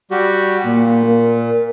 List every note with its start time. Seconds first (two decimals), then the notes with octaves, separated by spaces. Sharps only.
0.11 G3 F#4 G4
0.65 A#2 A#3
1.05 A#4